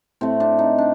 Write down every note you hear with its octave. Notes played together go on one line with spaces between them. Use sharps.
A2 A3 C4
D4
D#4
D4